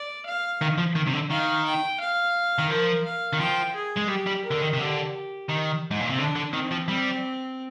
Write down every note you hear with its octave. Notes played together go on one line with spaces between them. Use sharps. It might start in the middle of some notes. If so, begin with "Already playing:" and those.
Already playing: D5
F5
D#3
F3
D#3
C3
D3
D#3 F5
G5
F5
D#3
F3 A#4
F5
D#3
F3 G5
G#4
G#3
G3 G4
G3
A#4
D3
D#3
C3
D3 G4
D#3
G#2
A#2
C3
D3 D4
D3
D#3 C4
F3
G3 C4